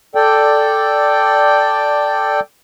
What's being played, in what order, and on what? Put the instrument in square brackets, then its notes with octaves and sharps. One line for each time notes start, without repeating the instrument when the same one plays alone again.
[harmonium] A4 D5 G5